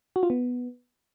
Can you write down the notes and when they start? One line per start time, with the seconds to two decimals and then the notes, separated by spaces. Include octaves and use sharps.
0.16 F#4
0.23 F4
0.30 B3